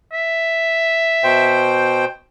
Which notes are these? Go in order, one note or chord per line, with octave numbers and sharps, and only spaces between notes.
E5
B2 C5 G5